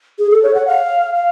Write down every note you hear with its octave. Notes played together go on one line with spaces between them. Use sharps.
G#4
A4
C#5
F#5
F5
F5